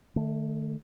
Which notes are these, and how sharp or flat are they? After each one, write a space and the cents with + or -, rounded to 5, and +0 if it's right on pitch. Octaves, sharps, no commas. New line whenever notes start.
D#3 -45 A3 +0